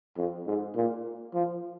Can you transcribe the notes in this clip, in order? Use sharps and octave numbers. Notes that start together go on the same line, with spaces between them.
F2
G#2
A#2
F3